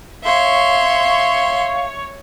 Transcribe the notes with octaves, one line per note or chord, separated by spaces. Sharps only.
C#5 E5 F5 C6